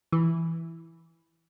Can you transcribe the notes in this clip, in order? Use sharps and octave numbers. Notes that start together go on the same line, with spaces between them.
E3